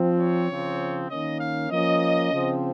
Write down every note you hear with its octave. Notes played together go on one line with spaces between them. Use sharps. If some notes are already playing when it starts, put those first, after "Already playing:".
Already playing: F3 C4
C#5
C#3 F3 C4
D#3 A#3 C#4 D#5
F5
F3 A#3 C#4 D#5
C#3 F3 C4